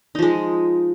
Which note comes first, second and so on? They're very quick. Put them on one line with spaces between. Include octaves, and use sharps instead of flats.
D#4 F3 G#3